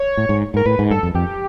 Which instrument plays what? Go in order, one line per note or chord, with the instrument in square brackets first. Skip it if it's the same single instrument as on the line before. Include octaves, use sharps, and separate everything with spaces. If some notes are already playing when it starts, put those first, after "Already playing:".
Already playing: [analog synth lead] C#5
[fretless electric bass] A2
G#2
[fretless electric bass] G#2 [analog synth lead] A#4
[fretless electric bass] A2 [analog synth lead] B4
[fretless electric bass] G#2
[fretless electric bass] G2 [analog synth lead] A4
[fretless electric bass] F2
[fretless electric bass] F2 [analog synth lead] G4